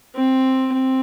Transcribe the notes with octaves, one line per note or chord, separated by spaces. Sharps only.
C4
C4